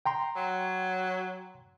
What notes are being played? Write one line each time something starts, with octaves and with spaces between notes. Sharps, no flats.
G5 A#5 C6
F#3